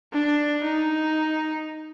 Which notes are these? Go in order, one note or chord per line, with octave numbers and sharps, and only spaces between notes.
D4
D#4